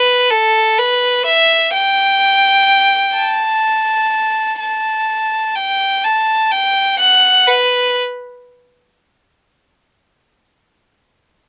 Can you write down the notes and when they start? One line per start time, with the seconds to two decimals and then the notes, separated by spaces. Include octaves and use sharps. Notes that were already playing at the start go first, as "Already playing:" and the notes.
Already playing: B4
0.31 A4
0.79 B4
1.26 E5
1.74 G5
3.17 A5
4.60 A5
5.55 G5
6.04 A5
6.52 G5
6.99 F#5
7.47 B4